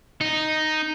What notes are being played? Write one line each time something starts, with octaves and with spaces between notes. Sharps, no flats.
D#4